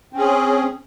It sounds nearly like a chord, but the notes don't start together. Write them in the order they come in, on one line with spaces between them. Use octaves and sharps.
C4 C#4 G#4